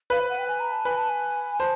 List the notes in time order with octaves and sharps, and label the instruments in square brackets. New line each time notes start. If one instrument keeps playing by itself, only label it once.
[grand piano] B4 [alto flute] F5
[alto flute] C5
F#5
G5
G#5
A#5
A5
[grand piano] B4 [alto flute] G#5
[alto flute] A5
G#5
[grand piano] C5 [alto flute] A5